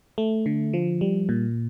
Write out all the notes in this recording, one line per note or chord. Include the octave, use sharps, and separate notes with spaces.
A3
D3
F3
G3
A#2